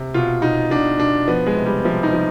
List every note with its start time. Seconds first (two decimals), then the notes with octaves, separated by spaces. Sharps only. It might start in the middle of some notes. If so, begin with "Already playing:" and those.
Already playing: C3
0.14 B2 F4
0.42 B2 D#4
0.70 B2 D4
0.99 B2 D4
1.28 F3 B3
1.46 G#3
1.56 C3
1.66 G3
1.84 C3 F3
2.03 D#4
2.13 F3